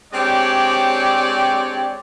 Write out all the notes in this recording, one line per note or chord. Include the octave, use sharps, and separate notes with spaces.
G#3 C4 D4 G4 C#5 D5